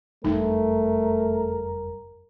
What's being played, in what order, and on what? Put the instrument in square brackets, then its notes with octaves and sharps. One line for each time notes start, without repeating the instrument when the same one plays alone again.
[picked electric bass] F#1 F2 G3 [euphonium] A3 [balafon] D#4 [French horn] A#4